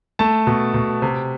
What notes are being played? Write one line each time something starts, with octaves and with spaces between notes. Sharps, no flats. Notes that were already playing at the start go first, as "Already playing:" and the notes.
A3 A5
B2
B2
C3